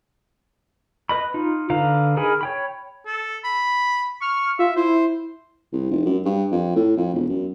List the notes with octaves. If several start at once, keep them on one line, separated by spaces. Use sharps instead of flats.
B4 D#5 B5
D#4 F4
D3 B4 F5 A#5
D#4 G#4 A#4 G#5 B5
C#5 G5 B5
A4
B5
C#6 F6
F4 E5
E4 C5
C2
F1
F#2
G2
F2
A2
F2
E1
F#2